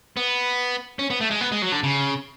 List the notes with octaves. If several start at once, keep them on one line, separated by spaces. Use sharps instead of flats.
B3
C#4
B3
A3
G#3
B3
G#3
F#3
D3
C#3